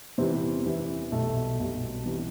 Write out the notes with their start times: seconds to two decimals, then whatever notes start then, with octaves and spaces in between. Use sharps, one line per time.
0.18 E2 C3 E3 G3 C4
0.65 E2 C3 E3 G3
1.12 B1 B2 G3 A3
1.59 B1 B2 G3
2.06 C3 E3 G3